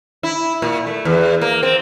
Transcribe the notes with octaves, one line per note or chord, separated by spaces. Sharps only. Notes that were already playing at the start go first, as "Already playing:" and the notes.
E4
A#2
A3
E2
A#3
C4